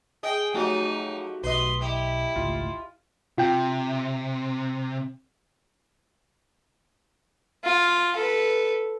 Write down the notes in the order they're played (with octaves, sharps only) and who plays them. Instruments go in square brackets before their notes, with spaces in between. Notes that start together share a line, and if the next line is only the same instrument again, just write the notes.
[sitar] G#4 D#5 [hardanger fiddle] G5
[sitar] F3 F#3 [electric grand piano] A3 F#4 G4 [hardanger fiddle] D#4
[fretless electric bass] B1 [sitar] B4 D#5 [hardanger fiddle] C6
[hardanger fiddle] E4 [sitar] G4
[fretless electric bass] G#1 C#2 A2 [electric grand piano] F4
[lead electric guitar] C3 [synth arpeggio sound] F4 G5
[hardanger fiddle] F4
A4 B4